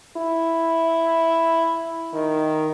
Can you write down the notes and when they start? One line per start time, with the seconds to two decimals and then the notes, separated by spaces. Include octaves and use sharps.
0.17 E4
2.14 D#3